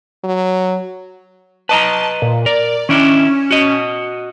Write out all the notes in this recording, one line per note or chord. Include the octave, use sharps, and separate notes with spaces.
F#3
B4 D#5 A5 A#5
A#2
A#4 D5
D#3 C#4 D4 E4
F#4 D#5